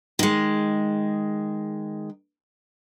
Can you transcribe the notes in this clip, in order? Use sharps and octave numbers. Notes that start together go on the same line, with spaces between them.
D#3 G#3